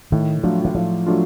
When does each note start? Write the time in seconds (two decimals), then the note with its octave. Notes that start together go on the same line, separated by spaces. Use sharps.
0.12 A2 D#3
0.43 F3 F#3 A3 D4 F4
0.65 E3
0.75 A2 F3
1.06 F#3 A3 D4 F4